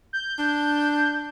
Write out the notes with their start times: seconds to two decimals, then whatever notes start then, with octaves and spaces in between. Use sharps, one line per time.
0.13 G6
0.38 D4